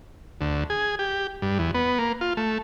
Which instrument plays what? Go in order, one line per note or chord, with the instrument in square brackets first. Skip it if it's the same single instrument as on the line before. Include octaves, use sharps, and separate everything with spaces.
[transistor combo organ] D2
G#4
G4
G2
E2
B3
A#3
F4
A3